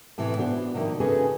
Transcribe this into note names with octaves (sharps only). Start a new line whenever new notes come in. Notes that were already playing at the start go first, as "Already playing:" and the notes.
A2 C3 E3
B3 D4 F#4 A#4 C5
C3 D#3 F3 A#3
C#3 C#4 F#4 G#4 A4 B4